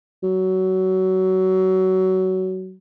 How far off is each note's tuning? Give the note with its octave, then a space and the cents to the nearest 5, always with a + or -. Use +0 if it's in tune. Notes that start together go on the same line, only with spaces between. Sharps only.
F#3 +20